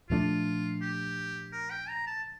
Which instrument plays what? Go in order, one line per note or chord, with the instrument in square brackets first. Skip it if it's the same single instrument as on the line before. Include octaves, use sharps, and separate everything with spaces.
[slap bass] A#2 F3 A3 D4 [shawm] F4
[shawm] G4
A#4
G5
A#5
A5